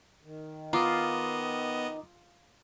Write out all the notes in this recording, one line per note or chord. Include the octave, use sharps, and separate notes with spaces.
D#3
B3 F4 D#5 A#5 D6 D#6